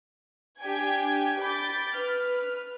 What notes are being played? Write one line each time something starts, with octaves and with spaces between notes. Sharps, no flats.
D4 G4 G5 G#5 G#6
B5 D6 G6 A6
B4 F6